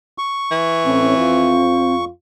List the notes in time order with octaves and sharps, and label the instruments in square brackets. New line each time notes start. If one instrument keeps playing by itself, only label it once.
[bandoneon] C#6
[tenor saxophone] E3
[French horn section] A2 C#4 [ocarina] C4
[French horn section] F2 F4